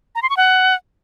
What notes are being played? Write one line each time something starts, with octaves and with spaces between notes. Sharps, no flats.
A#5
C6
C#6
F#5